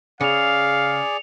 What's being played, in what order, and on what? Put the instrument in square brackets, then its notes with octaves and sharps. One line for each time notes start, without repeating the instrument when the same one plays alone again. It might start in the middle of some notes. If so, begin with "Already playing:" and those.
[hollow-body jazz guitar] C#3 [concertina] G#4 D5 [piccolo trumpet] F5 [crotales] C#7 F7